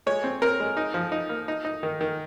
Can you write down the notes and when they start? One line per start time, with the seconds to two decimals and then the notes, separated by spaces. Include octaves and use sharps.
0.07 G#3 C#5
0.24 C4
0.42 C4 A#4
0.60 G#3
0.77 D#4
0.94 F3
1.12 D#4
1.29 A#3
1.48 D#4
1.65 D#4
1.83 D#3
2.01 D#3